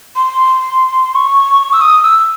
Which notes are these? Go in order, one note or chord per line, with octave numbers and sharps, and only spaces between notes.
C6
C#6
E6
D#6
E6